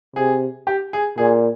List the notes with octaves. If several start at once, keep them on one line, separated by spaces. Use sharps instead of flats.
C3 G#4
G4
G#4
A#2 G#4